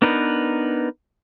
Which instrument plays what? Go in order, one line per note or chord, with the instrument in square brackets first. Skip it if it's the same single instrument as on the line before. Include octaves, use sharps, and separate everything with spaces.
[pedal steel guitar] B3 D4 D#4 A#4 B4